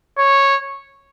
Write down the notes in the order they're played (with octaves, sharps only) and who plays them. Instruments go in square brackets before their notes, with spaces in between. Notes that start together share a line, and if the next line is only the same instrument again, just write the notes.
[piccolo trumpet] C#5